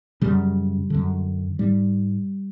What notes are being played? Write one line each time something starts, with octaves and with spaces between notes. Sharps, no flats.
F#2 C#3 G3
F#2 D3
G#2 G3